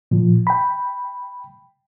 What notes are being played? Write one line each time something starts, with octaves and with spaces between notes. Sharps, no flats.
A#2 F3
G5 B5